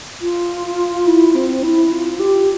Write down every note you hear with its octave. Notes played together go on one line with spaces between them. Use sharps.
F4
E4
C4
E4
F4
G4